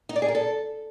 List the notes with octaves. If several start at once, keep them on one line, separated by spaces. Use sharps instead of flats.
D#4
D5
G#4
A#4
A4